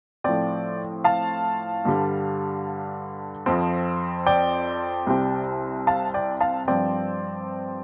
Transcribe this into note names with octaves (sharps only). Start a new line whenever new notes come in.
A2 F3 C4 D5 G5
F5 A5
G2 D3 G3
F2 F3 C4
D5 G5
C2 C3 G3 C4
F5 A5
D5 G5
F5 A5
G2 F3 C4 D5 G5